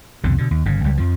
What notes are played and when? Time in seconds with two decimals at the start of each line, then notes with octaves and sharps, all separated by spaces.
0.24 C2 F2 B2 D3
0.38 B2 D3
0.51 D#2
0.65 G1 C#3
0.84 C#2 G3
0.97 F2 F3